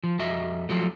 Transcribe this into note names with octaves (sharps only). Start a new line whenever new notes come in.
F3
F2 F#4 D#5 E5
F3 F#3 A3